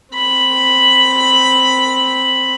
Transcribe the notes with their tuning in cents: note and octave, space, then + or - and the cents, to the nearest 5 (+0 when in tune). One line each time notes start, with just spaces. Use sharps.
C4 +0 B5 +0